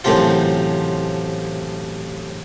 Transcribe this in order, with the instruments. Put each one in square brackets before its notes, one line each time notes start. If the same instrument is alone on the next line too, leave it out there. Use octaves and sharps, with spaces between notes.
[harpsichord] A1 F#2 A2 C3 F3 F4